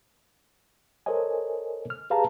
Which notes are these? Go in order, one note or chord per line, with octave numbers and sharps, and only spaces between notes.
A4 A#4 C5 C#5 D#5 G#5
F6
G4 G#4 B4 F5 A5 A#5